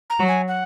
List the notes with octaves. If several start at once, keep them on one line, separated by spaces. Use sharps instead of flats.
A#5
F#3 F#4
G#5
F#5